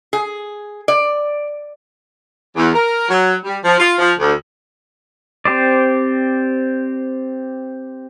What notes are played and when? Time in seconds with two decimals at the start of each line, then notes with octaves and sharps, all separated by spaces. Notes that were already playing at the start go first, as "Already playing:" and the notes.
0.13 G#4
0.88 D5
2.56 E2
2.73 A#4
3.09 F#3
3.44 G3
3.64 F3
3.79 F4
3.98 F3
4.18 D2
5.45 C4 G4 C5 D5